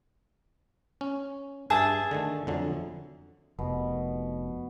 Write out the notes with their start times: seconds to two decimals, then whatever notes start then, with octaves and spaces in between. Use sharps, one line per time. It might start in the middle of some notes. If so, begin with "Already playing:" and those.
1.01 C#4
1.70 G2 G#4 E5 A5
2.11 D3 D#3 A3
2.47 F2 D3 F#3
3.59 F1 B2